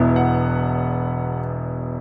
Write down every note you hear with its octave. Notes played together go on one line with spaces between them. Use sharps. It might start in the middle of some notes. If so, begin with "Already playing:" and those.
Already playing: E1 E2 B2 B3 E4
F#5